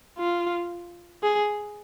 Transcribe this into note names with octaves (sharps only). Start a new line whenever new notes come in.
F4
G#4